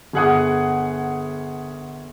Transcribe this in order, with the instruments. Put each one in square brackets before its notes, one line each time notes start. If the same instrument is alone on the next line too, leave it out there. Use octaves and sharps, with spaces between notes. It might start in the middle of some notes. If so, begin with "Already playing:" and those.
[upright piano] G1 G#4 F#5 D#6